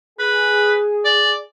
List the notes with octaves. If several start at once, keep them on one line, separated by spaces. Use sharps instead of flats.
G#4 B4
D5